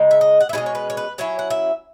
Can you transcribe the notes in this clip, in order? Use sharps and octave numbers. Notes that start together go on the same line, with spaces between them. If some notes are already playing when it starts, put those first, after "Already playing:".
Already playing: C#3 G#3 D#4
E5
D#5
F#5
E5
B2 G#3 C#4 E4 D#5
C#5
B4
C#5
B4
F#3 C#4 E4 C#5
F#5
E5